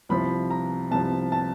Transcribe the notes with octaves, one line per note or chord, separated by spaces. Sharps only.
C2 C3 F3 B5
A#5
C2 C3 F3 A5
A5